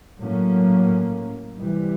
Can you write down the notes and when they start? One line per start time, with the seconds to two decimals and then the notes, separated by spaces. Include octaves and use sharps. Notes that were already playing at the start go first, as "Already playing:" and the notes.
0.20 A2 F#3 A#3 C#4
1.57 C3 E3 G3